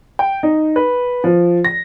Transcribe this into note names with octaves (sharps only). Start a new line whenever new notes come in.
G5
D#4
B4
F3
A#6